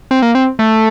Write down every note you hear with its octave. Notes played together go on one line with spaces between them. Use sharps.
C4
A#3
C4
A3